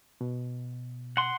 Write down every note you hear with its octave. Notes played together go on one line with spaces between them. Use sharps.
B2
F#5 C6